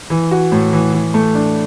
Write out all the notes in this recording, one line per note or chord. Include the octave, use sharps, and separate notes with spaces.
E3
F#4
A2
E3
E3
A3
D4